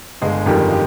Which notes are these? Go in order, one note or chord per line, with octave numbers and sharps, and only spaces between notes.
G1 G#3 G#4
F2 D#3 G3 G4
G4